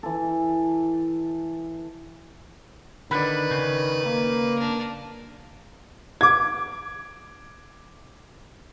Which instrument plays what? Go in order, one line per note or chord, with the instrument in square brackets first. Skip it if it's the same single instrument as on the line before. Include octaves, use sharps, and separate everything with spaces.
[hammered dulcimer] E3 A4
[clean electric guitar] D3 [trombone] D#3 [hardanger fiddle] B4 [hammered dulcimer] D5 B5
[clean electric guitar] C#3
[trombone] A#3
[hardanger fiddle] D4 A#4
[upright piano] D6 G#6